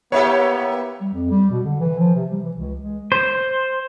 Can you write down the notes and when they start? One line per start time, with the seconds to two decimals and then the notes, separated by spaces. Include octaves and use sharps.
0.12 A#3 B3 E4 G4 C#5
1.01 G3
1.14 F2
1.31 G3
1.51 B2
1.65 D3
1.80 E3
1.99 F3
2.15 C3
2.30 G3
2.43 E3
2.57 C#2
2.81 G#3
3.12 C5